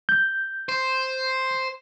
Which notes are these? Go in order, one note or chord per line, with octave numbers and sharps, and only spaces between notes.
G6
C5